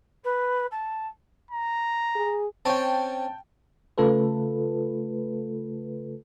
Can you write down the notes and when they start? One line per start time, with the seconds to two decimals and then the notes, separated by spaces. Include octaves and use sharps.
0.24 B4
0.71 A5
1.51 A#5
2.15 G#4
2.65 C4 C#4 G5 A5
3.98 C#3 A3 F4 A4 B4